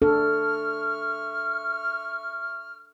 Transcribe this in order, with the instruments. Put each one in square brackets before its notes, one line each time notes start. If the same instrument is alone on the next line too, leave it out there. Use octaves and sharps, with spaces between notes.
[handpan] D4 A4 [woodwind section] E5 C#6 F6